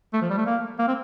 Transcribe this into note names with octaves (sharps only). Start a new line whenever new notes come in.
A3
F3
G3
A3
A#3
A#3
C4